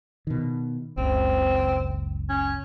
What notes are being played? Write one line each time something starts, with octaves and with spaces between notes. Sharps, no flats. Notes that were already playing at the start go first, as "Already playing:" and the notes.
B2 D#3
F#1 C#2 C#3 C4
C#4